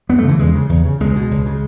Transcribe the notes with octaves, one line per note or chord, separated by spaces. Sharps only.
F#2 B3
A3
C#3 E3
E2 G#3
C#3
E2
C#3
C#2 G#3
B2
C#2
C#3